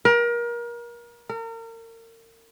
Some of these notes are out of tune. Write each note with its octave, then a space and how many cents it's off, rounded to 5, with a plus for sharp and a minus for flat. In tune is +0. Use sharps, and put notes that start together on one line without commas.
A#4 +30
A#4 -35